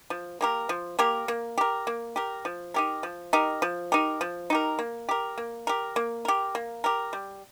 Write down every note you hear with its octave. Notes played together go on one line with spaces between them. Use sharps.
F3
A#3 G4 A#4
F3
A#3 G4 A#4
A#3
G4 A#4
A#3
G4 A#4
F3
D#4 G4 A#4
F3
D#4 G4 A#4
F3
D#4 G4 A#4
F3
D#4 G4 A#4
A#3
G4 A#4
A#3
G4 A#4
A#3
G4 A#4
A#3
G4 A#4
G3